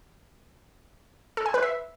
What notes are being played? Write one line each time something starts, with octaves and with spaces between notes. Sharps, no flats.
A4
G#5
B4
E5